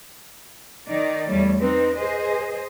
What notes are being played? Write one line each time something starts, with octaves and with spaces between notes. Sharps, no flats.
D#3 D#4 D5
E2 G3 A3 C#5
C4 D#4 B4
G#4 C5 D#5